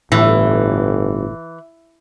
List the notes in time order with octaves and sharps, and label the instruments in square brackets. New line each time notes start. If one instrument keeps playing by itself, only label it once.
[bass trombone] G1 [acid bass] A2 [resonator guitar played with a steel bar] E3